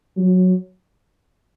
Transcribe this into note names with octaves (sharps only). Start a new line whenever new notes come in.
F#3